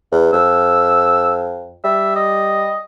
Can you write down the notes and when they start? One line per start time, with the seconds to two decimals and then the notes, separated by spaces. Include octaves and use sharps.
0.12 E2
0.33 F2 E6
1.84 G3 E5
2.16 D#5